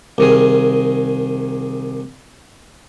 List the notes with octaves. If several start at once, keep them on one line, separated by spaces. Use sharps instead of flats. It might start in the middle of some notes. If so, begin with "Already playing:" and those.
C2 D#3 G#4